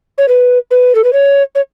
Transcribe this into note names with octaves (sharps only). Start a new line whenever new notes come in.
C#5
B4
B4
A4
B4
C#5
C#5